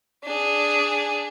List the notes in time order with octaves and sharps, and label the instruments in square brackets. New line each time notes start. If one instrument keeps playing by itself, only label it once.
[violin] D4 G#4